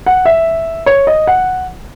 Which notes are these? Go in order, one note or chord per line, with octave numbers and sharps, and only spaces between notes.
F#5
E5
C#5
D#5
F#5